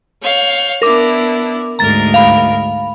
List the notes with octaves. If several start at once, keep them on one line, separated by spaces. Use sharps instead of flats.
C#5 F5 G6
B3 D4 E4 A#4 D6
D2 G#2 A#4 A#5 A6
F5 B5